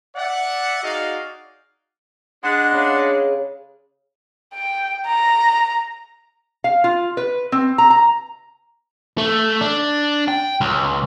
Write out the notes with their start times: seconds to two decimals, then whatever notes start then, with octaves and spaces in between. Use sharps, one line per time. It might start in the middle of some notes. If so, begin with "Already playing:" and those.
0.16 D5 E5 F#5
0.82 D#4 F#4 G#4 D5 D#5 F5
2.44 G#3 D4 F#5
2.73 C#3
4.54 G5
5.06 A#5
6.64 F5
6.84 F4
7.17 B4
7.52 C4
7.78 A#5
7.90 A#5
9.18 A3
9.61 D4
10.28 G5
10.61 C#2